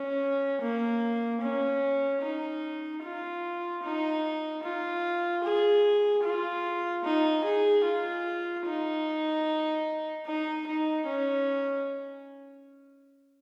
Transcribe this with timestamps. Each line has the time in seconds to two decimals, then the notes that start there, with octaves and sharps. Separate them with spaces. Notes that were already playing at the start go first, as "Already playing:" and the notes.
Already playing: C#4
0.61 A#3
1.41 C#4
2.22 D#4
3.03 F4
3.83 D#4
4.63 F4
5.43 G#4
6.24 F4
7.04 D#4
7.44 G#4
7.84 F4
8.66 D#4
10.26 D#4
10.67 D#4
11.07 C#4